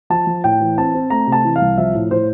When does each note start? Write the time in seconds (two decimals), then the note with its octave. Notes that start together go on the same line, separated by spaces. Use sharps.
0.10 F3 A5
0.27 F3
0.44 A2 G5
0.60 E3
0.78 C4 A5
0.94 C4
1.10 A3 A#5
1.27 C3
1.32 A5
1.45 E3
1.56 F5
1.61 C2
1.78 F3 E5
1.95 A2
2.11 A2 C5